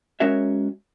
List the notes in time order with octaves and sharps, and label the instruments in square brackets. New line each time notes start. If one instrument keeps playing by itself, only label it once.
[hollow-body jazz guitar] G#3 C#4 F#4 A#4 C#5 E5